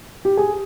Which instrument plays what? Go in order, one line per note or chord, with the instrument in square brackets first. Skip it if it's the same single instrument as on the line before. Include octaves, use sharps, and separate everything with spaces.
[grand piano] G4
G#4